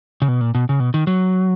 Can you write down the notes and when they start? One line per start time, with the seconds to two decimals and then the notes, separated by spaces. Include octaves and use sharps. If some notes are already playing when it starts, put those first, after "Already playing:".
0.22 C#3
0.28 B2
0.41 A#2
0.55 B2
0.69 C#3
0.80 B2
0.94 D#3
1.07 F#3